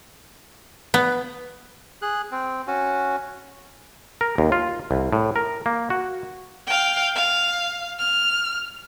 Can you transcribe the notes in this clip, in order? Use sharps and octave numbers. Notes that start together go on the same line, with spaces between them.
B3
G#4 F#6
C4
C#4 F#4
A#4
D#2
F4
C2
A2
A#4
A#3
F#4
F5 G5
F5
F6